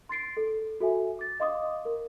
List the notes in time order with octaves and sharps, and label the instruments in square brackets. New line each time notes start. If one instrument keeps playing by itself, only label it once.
[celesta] C6 A6 C7 D7
A4
F#4 A4 E5 G#5
D6 A6
D#5 F5 C6 D6 D#6
A#4